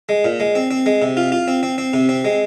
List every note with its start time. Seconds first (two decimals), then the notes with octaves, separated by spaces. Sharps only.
0.09 G#3
0.25 A#2
0.40 G#3
0.55 C4
0.71 C4
0.86 G#3
1.02 C3
1.17 F4
1.32 F4
1.48 C4
1.63 C4
1.78 C4
1.93 C3
2.09 C4
2.25 G#3